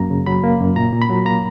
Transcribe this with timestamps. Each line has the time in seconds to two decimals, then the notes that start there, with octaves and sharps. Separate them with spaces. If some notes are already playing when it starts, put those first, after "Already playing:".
Already playing: F#2 A#3 A#5
0.10 C#3
0.26 F#3 B5
0.44 A#3
0.60 F#2
0.76 A#2 A#5
0.93 A#2
1.02 B5
1.10 F#3
1.25 A#3 A#5